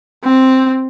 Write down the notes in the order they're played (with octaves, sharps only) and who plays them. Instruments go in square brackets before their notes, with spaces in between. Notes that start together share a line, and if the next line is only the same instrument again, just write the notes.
[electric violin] C4